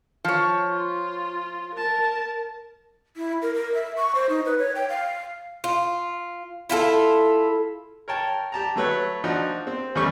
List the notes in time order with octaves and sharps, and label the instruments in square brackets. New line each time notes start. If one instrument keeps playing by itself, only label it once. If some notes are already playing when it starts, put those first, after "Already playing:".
[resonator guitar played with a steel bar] F3 C#5
[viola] F4
A#4 A5
[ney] E4
A#4
A#4
E5
C#6
C5
D#4
B4
C#5
G5
F5
[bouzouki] F4
E4 F4 G4 A4
[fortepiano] A#4 C#5 G5 A5
G4 A5 A#5
F#3 A3 B4 C#5
F3 D4 D#4 F#4
C4
E2 G3 A3 C#4 C#6